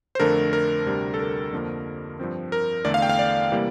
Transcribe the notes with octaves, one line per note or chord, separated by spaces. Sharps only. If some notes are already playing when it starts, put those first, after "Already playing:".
C5
F2 D3 A3 D4 A#4
A#4
D2 C3 G3 D4
A4
A#4
F2 D3 F3 A#3
G2 F3 C4
A#4
E2 D3 A3 D5
F5
G5
F5
D5
C3 E3 G3 A#3